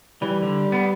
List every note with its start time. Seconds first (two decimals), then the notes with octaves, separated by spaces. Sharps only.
0.22 E3 G3
0.42 D3
0.72 B3